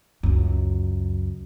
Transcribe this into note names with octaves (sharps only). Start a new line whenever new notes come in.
C#2 F#2